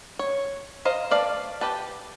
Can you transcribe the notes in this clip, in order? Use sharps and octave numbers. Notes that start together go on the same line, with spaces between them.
C#5
C5 D#5 F5 A#5
A3 B4 D5 F5 A5
G4 B4 A5